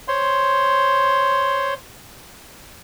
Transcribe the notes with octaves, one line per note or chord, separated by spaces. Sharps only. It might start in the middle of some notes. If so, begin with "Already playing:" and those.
C5 C#5 C6